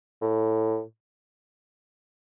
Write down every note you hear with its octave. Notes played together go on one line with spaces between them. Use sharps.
A2